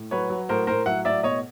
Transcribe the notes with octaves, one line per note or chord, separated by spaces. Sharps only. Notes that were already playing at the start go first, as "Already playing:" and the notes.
Already playing: A2
F#3 B4 C#5
F#3
A2 A#4 C5
A2 A#4 C5
F#3 E5 F#5
A2 D5 E5
B2 C#5 D#5